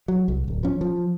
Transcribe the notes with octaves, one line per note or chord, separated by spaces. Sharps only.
F#3
C2
D1
F3 C#4
F3